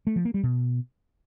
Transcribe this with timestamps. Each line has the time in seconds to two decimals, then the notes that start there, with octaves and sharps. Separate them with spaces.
0.07 A3
0.16 F3
0.25 A#3
0.34 G3
0.43 B2